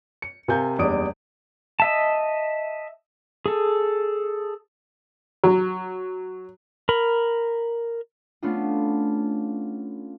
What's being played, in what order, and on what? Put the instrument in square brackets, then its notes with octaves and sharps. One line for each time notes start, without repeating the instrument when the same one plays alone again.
[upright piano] C#7
C3 A#4 F5 G#5 G6
F#1 E2 G3 D4 D#6 D7
[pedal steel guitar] D#5 E5 A5
G#4 A4
[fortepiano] F#3
[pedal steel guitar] A#4 B5
[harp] A3 B3 C#4 D4 F4